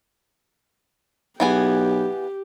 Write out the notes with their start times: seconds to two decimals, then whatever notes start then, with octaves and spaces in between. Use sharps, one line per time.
1.40 B1 E3 B3 G4 G#4